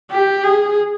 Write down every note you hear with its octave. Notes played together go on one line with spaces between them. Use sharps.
G4
G#4